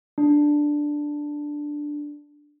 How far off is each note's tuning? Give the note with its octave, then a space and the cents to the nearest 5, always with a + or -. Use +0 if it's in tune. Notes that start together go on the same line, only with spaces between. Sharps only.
D4 +5